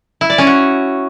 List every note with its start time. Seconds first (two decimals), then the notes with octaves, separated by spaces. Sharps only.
0.21 E4
0.30 D5
0.38 C#4
0.47 F#4